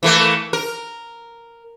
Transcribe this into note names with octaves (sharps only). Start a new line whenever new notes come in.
E3 A3 A#3
A#4